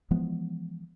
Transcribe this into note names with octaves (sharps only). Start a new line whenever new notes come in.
E3 F3 G#3 B3